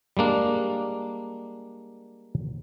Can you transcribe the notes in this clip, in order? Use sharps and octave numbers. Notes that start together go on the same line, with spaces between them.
G3 G#3 A#3 D4